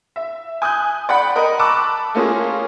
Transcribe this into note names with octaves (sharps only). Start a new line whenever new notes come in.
E5
G#5 D#6 F#6 G6
D5 F#5 G5 B5
A#4 D#5
A5 B5 C#6 D6 E6 F#6
A3 A#3 C#4 F4 G#4